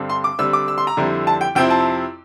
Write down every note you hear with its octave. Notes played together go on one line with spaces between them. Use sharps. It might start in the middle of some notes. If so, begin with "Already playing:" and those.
Already playing: G2 D3 G3 C4
C6
D6
D3 G3 C4 E6
D6
E6
C6
A#5
F2 D3 G3 C4 E4
A5
G5
F2 C3 F3 C4 E4 G5
A5